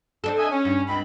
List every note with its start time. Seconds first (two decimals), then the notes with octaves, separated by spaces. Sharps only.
0.24 C4 D4 A4
0.38 D#5 E5 G#5
0.51 C#4
0.65 G2
0.88 C#2 C4 B5